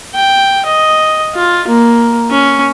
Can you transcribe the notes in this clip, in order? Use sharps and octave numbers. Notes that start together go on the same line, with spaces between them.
G5
D#5
F4
A#3
C#4